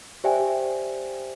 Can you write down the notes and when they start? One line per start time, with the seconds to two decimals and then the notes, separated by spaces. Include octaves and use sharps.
0.24 G4 C5 D5 E5 G5 G#5